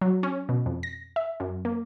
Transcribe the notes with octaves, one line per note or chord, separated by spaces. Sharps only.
F#3
C#4
B2
F2
A#6
E5
F#2
A#3